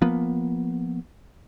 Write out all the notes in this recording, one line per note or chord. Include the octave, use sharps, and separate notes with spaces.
F3 A#3 B3